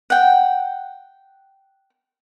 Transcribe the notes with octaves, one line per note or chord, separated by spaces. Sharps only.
F#5 G5